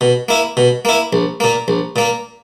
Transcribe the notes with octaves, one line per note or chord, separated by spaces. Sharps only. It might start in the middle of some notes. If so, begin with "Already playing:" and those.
B2
A#3 E4
B2
A#3 E4
A#1
A#2 A#3
A#1
A#2 A#3